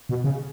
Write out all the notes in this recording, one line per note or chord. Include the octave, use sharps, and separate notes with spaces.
B2
C#3